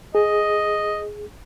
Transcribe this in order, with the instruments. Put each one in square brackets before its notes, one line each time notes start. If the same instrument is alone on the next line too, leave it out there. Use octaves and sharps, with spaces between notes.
[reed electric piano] G#4 [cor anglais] D#5